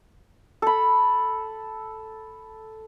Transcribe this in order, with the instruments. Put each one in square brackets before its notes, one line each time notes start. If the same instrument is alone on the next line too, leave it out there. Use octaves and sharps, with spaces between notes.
[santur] A4 B5